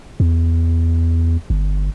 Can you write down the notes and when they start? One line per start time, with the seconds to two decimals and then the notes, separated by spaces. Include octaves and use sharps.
0.20 E2
1.50 G1